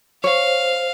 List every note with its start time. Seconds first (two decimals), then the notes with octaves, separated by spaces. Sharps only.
0.24 C5 C#5 F5